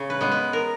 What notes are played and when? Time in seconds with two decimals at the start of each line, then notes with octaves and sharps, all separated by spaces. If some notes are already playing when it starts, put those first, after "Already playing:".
Already playing: C#3
0.10 B4
0.21 G#3 B3
0.31 B4
0.53 A#4